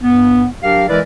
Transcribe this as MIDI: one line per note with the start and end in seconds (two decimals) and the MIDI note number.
0.02 0.45 43
0.02 0.45 59
0.63 0.85 54
0.63 0.85 62
0.63 0.85 67
0.63 0.85 70
0.63 0.85 77
0.89 1.01 52
0.89 1.01 56
0.89 1.01 64
0.89 1.01 70
0.89 1.01 71
0.89 1.01 74